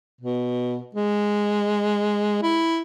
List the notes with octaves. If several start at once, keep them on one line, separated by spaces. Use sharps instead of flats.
B2
G#3
E4